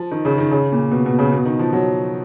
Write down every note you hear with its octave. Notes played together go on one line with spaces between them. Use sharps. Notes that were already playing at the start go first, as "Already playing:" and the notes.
Already playing: F3
D#3
C#3
D#3
C#3
A#2
B2
B2
C#3
B2
D#3
F3
F#3